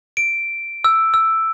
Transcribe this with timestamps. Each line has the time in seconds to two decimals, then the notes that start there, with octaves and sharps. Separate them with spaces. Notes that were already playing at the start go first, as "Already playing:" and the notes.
0.17 D7
0.84 E6
1.14 E6